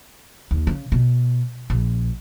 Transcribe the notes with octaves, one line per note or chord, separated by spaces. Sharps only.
D#2
C#3
B2
A#1